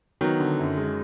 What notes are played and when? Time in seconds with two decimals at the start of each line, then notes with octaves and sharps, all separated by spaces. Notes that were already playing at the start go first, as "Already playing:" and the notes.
0.21 D#3 F#3 B3
0.40 D3
0.59 F#2
0.77 G#3